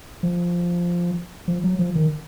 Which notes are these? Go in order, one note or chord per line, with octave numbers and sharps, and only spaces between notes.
F3
F3
F#3
F3
D#3